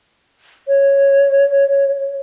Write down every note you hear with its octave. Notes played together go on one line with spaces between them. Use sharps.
C#5